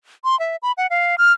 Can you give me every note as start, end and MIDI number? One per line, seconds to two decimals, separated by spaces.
0.24 0.38 84
0.40 0.56 76
0.62 0.72 83
0.77 0.87 78
0.90 1.16 77
1.18 1.33 89